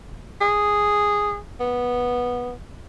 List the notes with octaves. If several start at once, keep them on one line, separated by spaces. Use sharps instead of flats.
G#4
B3